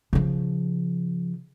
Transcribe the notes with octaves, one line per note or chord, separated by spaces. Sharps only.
C#3 F3